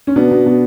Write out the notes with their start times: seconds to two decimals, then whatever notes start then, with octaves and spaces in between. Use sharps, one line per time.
0.07 C#4
0.16 B2 B3 D4
0.31 B2
0.46 B2